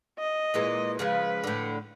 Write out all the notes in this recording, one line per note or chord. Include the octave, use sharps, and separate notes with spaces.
D#5
A#2 E3 G#3
C#3 F3 G#3 B4
A2 D3